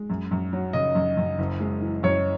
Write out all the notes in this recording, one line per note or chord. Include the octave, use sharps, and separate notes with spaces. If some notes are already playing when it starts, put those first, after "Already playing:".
Already playing: G#3
F#2
F#2
F#3
C#3 D#5
F#2
F#2
F#1
G#3
E3
F#2 C#5